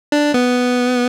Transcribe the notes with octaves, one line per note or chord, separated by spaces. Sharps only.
D4
B3